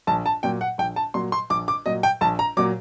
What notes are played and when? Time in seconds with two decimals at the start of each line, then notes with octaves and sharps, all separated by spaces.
0.07 A#1 A5
0.26 A5
0.43 A#2 F#3 G5
0.61 F#5
0.78 A#1 G5
0.96 A5
1.14 A#2 F#3 C6
1.32 C6
1.50 A#1 D6
1.68 D6
1.86 A#2 F#3 D#5
2.03 G5
2.21 A#1 A5
2.39 A#5
2.57 A#2 F#3 D6